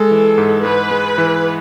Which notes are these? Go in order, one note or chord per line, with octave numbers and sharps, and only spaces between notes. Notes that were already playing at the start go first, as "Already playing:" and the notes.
Already playing: G#3 A4
E3
G#2
G#2 B4
G#3
E3